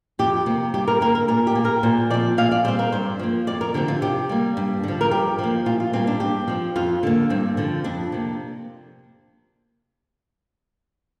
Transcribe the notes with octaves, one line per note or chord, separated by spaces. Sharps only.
F2 G4
C3 A#3
G2 G4
A#4
D3 A#3 A#4
A#4
A#2 A#4
G4
A#3
A#4
A#2 C5
F3 C4 D5
A#2 F5
D5
G3 C4 C5
A#4
G2 C5
F3 A#3
F2 D5
A#4
D3 F3 C4 G4
F4
C3 G4
G3 A#3
G2
D3 F3
A#4
G2 G4
F3 A#3
A#2 F4
F4
G3 A#3 C4
D4
G2 G4
F3 C4
F2 F4
D3 A#3
G2 C4
D3 F3 C4
F2 D4
C3 A#3